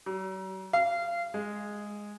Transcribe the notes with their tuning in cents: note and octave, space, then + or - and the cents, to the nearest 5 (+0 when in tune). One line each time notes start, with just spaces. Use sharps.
F#3 +45
F5 -25
G#3 -5